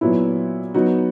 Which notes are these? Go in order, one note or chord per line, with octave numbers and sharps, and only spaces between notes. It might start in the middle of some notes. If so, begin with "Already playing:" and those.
A#2 F#3 B3 E4
F#3 B3 D#4 F#4